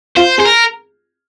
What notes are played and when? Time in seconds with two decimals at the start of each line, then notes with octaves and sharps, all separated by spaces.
0.16 F4 C5
0.38 G#4 C5
0.45 A#4